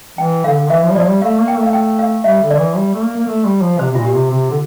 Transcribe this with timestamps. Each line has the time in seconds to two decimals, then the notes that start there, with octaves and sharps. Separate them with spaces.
0.18 E3 G5
0.44 D3 F5
0.58 D3
0.70 E3 E5
0.83 F3
0.91 G3
0.95 F3 D5
1.09 G3
1.22 A3 F5
1.39 A#3
1.48 G5
1.56 A3
1.63 F5
1.73 G5
1.99 F5
2.24 G3 E5
2.42 D3
2.50 D5
2.59 E3
2.76 G3
2.93 A3
3.02 A#3
3.17 A#3
3.27 A3
3.44 G3
3.61 F3
3.79 C3 C5
3.91 C3
3.95 A#2 F4
4.05 G4
4.14 C3
4.30 C3
4.50 D3